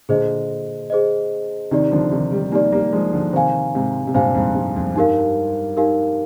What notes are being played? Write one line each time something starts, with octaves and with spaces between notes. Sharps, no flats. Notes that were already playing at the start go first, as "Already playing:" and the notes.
A#2 D3 G#4 C5 D#5
G#4 C5 D#5
C3 D#3 D#4 G4 D5
D3 F3
C3 D#3
D#3 G3
G3 A#3 D#4 G4 D5
G3 A#3
F3 G#3
D3 F3
C3 D#3 C5 F5 G#5
G#2 C3
C3
G2 A#2 C5 F5 G#5
F2 G#2
G2
F2
G2 D#4 G4 A#4 F5
D#4 G4 A#4 F5